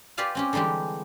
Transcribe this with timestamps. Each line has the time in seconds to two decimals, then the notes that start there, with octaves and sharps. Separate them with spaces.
0.17 F4 G4 B4 D5 F5 G#5
0.35 C4 C#4 G4
0.53 D3 E3 G3 G#3 G4